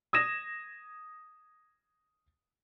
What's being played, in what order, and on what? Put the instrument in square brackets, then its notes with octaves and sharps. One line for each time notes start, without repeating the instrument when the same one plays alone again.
[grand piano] D#6 G#6 A#6 E7